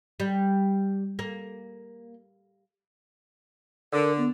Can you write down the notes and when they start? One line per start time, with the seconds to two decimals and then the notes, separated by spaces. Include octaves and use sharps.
0.20 G3
1.19 A#3
3.93 D3 A#4
4.18 B3